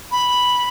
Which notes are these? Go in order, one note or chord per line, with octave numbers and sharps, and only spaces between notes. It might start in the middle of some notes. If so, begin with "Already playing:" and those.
B5